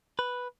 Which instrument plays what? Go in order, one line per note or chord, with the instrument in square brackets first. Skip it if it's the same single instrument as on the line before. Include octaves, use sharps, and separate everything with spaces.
[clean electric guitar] B4